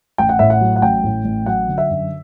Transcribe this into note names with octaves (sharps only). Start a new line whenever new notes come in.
A1 G5
F#5
A2 E5
F#5
F#3
F#5
A1 G5
A2
A1
F#3 F#5
D3
E5
F#2